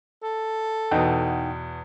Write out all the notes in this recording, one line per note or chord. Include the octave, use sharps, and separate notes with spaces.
A4
E2 B2 D#4 F#5 G5